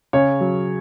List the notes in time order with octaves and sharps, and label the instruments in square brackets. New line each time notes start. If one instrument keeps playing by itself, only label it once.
[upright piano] C#3 C#5
F#3